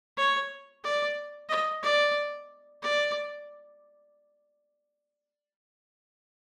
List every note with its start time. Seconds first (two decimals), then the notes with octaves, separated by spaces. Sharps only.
0.17 C#5
0.84 D5
1.49 D#5
1.83 D5
2.82 D5